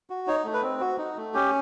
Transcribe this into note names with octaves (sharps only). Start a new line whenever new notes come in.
F#4
D#4 C#5
A3
B4
C4
F#4
D#4
A3
C#4 G4